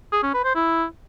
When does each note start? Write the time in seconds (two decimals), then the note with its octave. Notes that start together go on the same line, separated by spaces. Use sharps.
0.12 G#4
0.23 C#4
0.34 B4
0.45 C5
0.55 E4